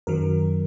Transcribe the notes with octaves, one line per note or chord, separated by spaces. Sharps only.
F#2 D#3 F#3 A#4